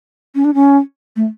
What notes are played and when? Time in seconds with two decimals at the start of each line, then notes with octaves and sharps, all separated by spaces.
0.35 C#4
0.45 D4
0.54 C#4
1.16 A3